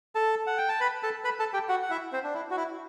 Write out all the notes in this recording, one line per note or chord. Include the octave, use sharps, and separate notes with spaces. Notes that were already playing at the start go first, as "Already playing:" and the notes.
A4 A5
F#5
G5
A5
B4 B5
A4 A5
B4 B5
A4 A5
G4 G5
F#4 F#5
F#5
E4 E5
C4 C5
D4
E4
F#4
E4